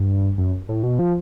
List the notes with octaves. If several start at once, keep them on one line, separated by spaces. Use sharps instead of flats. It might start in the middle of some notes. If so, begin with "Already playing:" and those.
Already playing: G2
F#2
A2
B2
F3